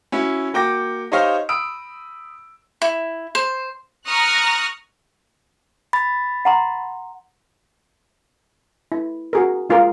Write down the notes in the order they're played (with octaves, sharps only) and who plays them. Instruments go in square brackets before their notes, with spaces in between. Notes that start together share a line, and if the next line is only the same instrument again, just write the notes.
[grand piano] C#4 E4 F#4 E5
A#3 F#4 G5 D6 A#6
D#4 G4 C5 C#5 D#5 F5
B5 D#6 E6 D7
[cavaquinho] E4
C5
[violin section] A#5 C#6 D#6 F6 F#6 A#6
[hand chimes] B5 A6
[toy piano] F#5 A#5 C6
[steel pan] E4
F#4 G#4 A#4
G#3 F4 G#4 A#4